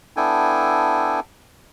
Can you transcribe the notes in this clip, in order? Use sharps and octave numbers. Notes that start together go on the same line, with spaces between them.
B3 D4 E4 A4 G5 G#5